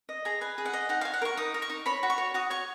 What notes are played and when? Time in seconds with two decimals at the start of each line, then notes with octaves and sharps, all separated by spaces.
0.09 D#5
0.25 G#4 A#5
0.41 B4 G#5
0.58 G#4
0.65 F#5
0.73 D#5
0.89 D#4 F#5
1.01 C#5 F5
1.14 F#5
1.22 A#4 C#6
1.37 D#4 D#6
1.54 A#4
1.62 C#6
1.70 D#4
1.86 C#5 B5
2.03 F#4
2.10 C#6
2.18 C#5
2.34 F#4 D#6
2.50 C#5 C#6